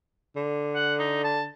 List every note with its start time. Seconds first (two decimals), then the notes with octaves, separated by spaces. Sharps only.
0.36 D3
0.75 F#5
0.99 D#4
1.24 A5